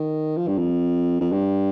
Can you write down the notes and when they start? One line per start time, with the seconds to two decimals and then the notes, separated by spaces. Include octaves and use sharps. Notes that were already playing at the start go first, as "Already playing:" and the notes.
Already playing: D#3
0.36 F3
0.47 G2
0.58 F2
1.21 F2
1.32 G2